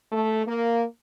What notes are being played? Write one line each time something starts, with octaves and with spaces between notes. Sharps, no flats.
A3
A#3